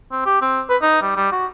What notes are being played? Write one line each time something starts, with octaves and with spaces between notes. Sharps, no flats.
C4
G4
C4
B4
D#4
G3
G3
F#4